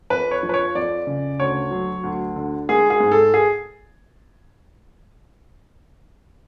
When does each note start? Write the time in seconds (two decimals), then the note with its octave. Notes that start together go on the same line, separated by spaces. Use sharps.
0.10 F2 B4
0.31 C#5
0.43 F3
0.49 B4
0.54 C#5
0.75 F2 D5
1.07 C#3
1.39 D2 C#5
1.71 F#3
2.03 D2
2.36 D3
2.69 G#3 G#4
2.90 G#4
3.00 G#2
3.12 A4
3.34 G#4